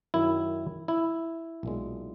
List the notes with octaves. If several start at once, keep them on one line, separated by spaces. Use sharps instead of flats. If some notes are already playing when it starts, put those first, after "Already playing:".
F#2 D#3 F#3 E4
E4
B1 A#2 G#3